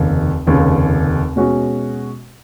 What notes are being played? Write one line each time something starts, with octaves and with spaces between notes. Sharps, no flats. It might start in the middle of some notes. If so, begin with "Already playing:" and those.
Already playing: F1 D#2 C#3
F1 D#2 C#3
B2 G#3 C#4 F#4